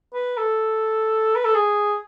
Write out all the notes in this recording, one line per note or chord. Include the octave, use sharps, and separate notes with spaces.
B4
A4
B4
A4
G#4